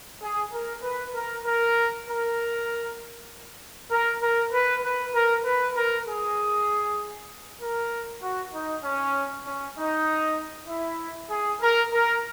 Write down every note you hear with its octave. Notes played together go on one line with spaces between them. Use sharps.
G#4
A#4
B4
A#4
A#4
A#4
A#4
A#4
B4
B4
A#4
B4
A#4
G#4
A#4
F#4
D#4
C#4
C#4
D#4
E4
G#4
A#4
A#4